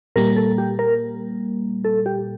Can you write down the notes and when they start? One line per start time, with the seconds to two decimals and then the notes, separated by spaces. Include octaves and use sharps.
0.16 A#2 G3 A#3 A#4
0.36 A4
0.58 G4
0.79 A#4
1.85 A4
2.06 G4